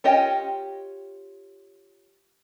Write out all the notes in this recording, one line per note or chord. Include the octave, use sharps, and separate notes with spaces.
C#4 F4 G4 D#5 G5